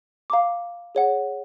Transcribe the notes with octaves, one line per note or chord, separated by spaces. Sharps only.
F5 A#5 D6
G#4 C#5 F#5